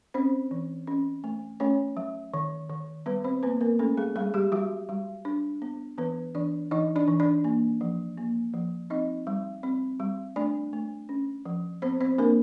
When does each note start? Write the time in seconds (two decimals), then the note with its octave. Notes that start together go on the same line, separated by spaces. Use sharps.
0.14 C4 C#4 C5
0.51 E3
0.87 C#4
1.24 A3
1.60 A3 C#4 C#5
1.97 F#3
2.34 D#3
2.70 D#3
3.06 G3 B3 B4
3.24 C4 C5
3.43 A#3 B3 B4
3.61 A#3 A#4
3.79 A3 C#4 A4
3.97 G#3 G#4
4.16 G3 G#3 G#4
4.34 G3 G4
4.52 F#3 G3 F#4
4.89 G3
5.25 D4
5.62 B3
5.98 E3 B3 B4
6.35 E3 D4 D5
6.71 E3 D#4 D#5
6.96 D4 D5
7.08 E3
7.20 D4 D5
7.44 A#3
7.81 F3
8.17 A#3
8.54 F3
8.90 C4 D#4 D#5
9.27 G3
9.63 C4
10.00 G3
10.36 A3 D4 D5
10.73 A3
11.09 C#4
11.46 F3
11.82 B3 C4 C5
12.01 C4 C5
12.18 A#3 D4 A#4